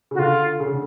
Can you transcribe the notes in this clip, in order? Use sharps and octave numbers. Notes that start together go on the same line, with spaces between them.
C#3
F#4
D3 F4
C#3
D3